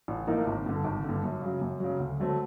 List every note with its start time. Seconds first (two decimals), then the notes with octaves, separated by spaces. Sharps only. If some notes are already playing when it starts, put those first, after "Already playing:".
0.08 A1
0.27 A2 F3 A#3 D#4
0.46 G#1
0.66 G2 D3
0.85 G#1
1.04 G2 D3
1.23 F#2
1.42 C#3 F#3
1.61 F#2
1.80 C#3 F#3
2.00 D2
2.20 D3 F#3 A3 C4